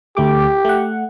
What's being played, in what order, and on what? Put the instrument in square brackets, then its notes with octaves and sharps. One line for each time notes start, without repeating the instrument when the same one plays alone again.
[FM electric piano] D2 A3 D6 [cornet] G4
[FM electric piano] A3 F#5